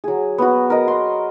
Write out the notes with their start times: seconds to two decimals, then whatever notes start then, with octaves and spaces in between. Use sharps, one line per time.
0.04 F#3 G#4
0.38 B3 F#4
0.70 A#4 D#5
0.88 C6